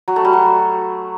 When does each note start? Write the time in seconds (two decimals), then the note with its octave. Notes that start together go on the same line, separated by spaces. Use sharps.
0.08 F#3
0.16 A3
0.25 G3
0.33 F#3